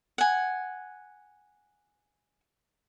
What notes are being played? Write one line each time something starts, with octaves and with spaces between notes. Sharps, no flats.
F#5 G#5